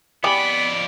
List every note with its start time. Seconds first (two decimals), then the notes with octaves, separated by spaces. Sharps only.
0.24 F2 B3 E4 G4 G#4 D5 B5